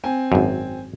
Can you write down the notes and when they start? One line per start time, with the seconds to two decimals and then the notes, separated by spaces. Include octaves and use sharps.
0.04 C4 G#5
0.32 G#1 F#2